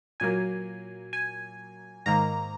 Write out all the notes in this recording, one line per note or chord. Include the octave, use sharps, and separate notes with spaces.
A#2 F#3 A#3 G#5
G#5
G#2 D#3 A#3 A#5